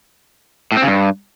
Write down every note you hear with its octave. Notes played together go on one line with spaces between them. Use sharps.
A2
C4
C#3
G2